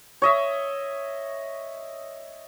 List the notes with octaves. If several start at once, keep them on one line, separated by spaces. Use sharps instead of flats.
C#5 D#5 E5